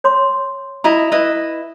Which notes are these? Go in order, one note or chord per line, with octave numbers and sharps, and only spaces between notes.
C#5 C6 D6
E4 D#5 A#5
E4 B4 D#5